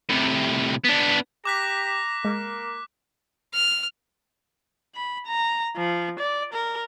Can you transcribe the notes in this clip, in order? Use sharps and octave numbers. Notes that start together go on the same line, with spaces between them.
A2 C3
B3 D4
G4 A#5 D6 F#6 B6
G#3 A#3
F6
B5
A#5
F3
D5
A#4